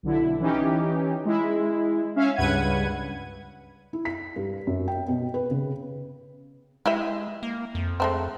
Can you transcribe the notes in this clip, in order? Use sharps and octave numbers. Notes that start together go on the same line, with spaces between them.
B1 D3 E4
E3 C#4 D#4 G4
G#3 E4
C#4 E5 F5
C#2 G2 B4 F#5 G#6 D#7
E4
B6
G2
F#2
G5
B2
B4
C#3
G#3 E4 G4 E5
A#3
F2
G#3 A3 C4